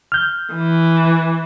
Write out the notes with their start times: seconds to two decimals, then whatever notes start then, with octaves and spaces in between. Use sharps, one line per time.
0.12 F6 G6
0.54 E3